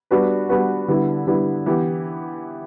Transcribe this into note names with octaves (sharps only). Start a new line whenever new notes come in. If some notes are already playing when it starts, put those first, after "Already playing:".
G3 B3 D4 F#4 B4
G3 B3 D4 F#4 B4
D3 G3 B3 E4
D3 G3 B3 E4
E3 B3 E4 G4